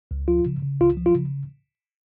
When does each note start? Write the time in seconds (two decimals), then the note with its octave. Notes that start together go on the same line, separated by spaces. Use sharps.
0.11 C#2
0.28 F3 F4
0.46 C#3
0.62 C#3
0.80 C#2 F4
0.97 F3
1.06 F4
1.15 C#3